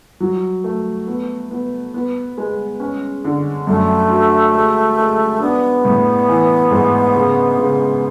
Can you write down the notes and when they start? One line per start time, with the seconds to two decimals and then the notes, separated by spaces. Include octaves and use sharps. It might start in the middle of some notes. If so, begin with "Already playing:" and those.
0.20 F#3
0.64 A3
1.07 B3
1.51 B3
1.94 B3
2.38 G#3
2.80 C#4
3.24 D3
3.67 F#2 A3
4.10 F#4
4.54 G#3
4.97 G#3
5.40 B3 D4
5.85 A2
6.28 E3
6.71 G#2
7.15 C#3
7.57 C#3